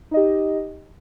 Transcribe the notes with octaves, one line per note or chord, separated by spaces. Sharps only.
D#4 G4 D#5